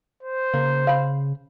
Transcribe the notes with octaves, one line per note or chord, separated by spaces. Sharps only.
C5
C#3 A#3
F5 B5